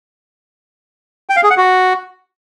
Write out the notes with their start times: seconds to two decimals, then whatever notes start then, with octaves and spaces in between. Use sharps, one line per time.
1.29 G5
1.36 F5
1.43 G#4
1.50 F#5
1.57 F#4